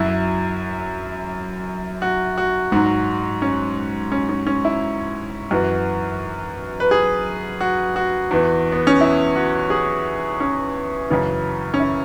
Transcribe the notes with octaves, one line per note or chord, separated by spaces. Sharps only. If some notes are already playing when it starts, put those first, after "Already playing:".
Already playing: F#2 F#3 E4
F#4
F#4
G#2 F#3 F#4
C#4
C#4
C#4
C#4
E4
F#2 E3 F#4
B4
G#4
F#4
F#4
E2 E3
B3
C#4
E4
F#4
G#4
C#4
F#2 C#3 E3 C#4
C#4
E4